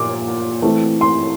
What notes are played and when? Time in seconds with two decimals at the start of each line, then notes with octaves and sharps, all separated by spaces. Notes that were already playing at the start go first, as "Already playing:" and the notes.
Already playing: A#2 F3 D6
0.62 E3 A3 C4
1.01 C6